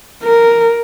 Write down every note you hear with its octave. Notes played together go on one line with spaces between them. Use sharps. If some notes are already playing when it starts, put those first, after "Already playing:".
A#4